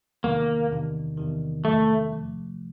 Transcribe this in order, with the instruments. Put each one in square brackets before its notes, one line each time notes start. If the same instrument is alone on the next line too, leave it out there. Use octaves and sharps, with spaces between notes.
[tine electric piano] E2 C3 D#3 [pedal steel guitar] A#3
[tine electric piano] E2 C3 D#3
E2 C3 D#3
[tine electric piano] E2 C3 D#3 [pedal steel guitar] A3
[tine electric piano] C3 F3 A3